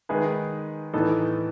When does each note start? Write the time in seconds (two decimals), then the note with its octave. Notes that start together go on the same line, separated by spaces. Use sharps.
0.09 D#3 G#3 D#4 G#4 B4
0.94 A2 E3 B3 D#4 A4